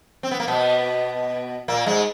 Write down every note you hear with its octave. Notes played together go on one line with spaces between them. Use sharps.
C4
B3
A#3
B2 B3
A#2 A#3
G#2 G#3